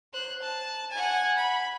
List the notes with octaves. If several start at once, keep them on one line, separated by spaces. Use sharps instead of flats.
C5 F#6
A5
F#5 G#5
B5